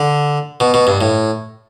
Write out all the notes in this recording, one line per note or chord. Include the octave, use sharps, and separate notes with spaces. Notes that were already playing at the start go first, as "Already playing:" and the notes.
Already playing: D3
B2
B2
G2
A2